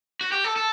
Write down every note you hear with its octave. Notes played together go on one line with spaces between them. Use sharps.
F#4
G4
A4
A4